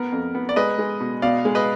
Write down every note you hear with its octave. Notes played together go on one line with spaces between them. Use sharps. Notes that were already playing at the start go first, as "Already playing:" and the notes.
Already playing: B3 A#4
F2
B3
D5
G#3 B4 D#5
G#3
B2
B2 D5 F5
G#3
B4 D#5